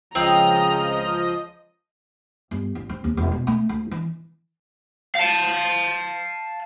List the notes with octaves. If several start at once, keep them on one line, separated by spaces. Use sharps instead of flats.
C#2 C#3 F3 C4 D#5 A#5
G1
A1
C4
D#2
E1
B2
A3
D2
E3
F5 A5